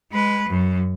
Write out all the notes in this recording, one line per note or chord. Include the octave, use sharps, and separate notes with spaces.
G#3 B4
F#2